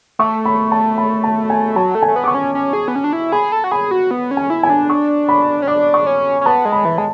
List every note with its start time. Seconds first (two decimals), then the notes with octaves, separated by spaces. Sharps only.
0.19 A3 C#6
0.45 B5
0.72 A5
0.98 B5
1.24 A5
1.50 G#5
1.76 F#3 A5
1.95 A3
2.02 G#5
2.08 A3
2.16 B3
2.24 D6
2.28 C#6
2.35 C#4
2.55 C#4
2.73 G#4
2.88 B3
2.96 C#4
3.04 D4
3.13 E4
3.32 G#4 B5
3.52 A4
3.64 F#4
3.71 G#4 B5
3.91 F#4
4.11 B3
4.31 C#4
4.37 G#5
4.50 E4
4.63 G#5
4.70 D4
4.90 C#6
5.29 B5
5.62 C#4
5.67 D4 D6
5.94 C#6
6.07 C#4
6.41 C#4
6.46 B3 A5
6.65 G#3
6.72 B5
6.85 E3
6.98 G#3 A5